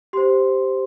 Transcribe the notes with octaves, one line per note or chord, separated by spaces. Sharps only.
G4 C5 C6